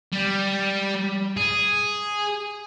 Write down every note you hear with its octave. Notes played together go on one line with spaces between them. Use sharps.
G3
G#4